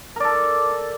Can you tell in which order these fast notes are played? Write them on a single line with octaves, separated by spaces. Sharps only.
A#4 D5 A4